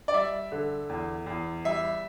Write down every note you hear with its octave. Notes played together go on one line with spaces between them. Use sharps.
D5
G3 E5
D3
E2
E2
G3 E5